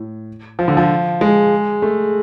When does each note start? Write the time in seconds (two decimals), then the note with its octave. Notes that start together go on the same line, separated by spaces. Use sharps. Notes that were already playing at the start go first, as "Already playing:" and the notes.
Already playing: A2
0.59 F3
0.68 D3
0.77 F3
1.21 G#3
1.82 A3